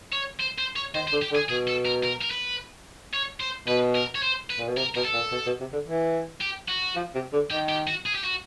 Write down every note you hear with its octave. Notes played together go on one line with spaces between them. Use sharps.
C#5
C5
C5
C#5
D#3 C5
C5
D3
G4
D3
G#4
B2 G#4
A4
A#4
A#4
A#4
B4
C#5
C5
B2 B4
A#4
C#5
C5
B4
A#2
B2
C3 A#4
B2 A#4
A4
A#2
B2
B2
C3
D3
E3
G4
F#4
F3
C3
D3
D#3 G4
G4
F#4
G#4
G4
F#4